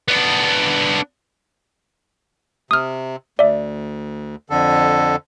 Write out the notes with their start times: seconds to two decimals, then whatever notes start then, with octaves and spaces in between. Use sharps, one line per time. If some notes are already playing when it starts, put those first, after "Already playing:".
0.08 B3 D4
2.71 C3 D#6 F6
3.39 D2 D5 E5
4.50 F2 D3 A4